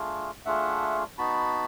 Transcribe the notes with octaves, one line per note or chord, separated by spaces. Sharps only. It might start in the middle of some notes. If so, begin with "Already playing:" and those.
Already playing: A3 D4 F4 G#4
A3 D4 F4 G#4 E5 F#5
B3 D#4 F#4 A5 B5